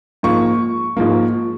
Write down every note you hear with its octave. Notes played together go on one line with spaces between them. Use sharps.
G#2 F3 A#3 C#6
G#2 F3 A#3